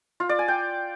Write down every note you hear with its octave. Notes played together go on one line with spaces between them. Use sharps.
F4
D5
G#5
G5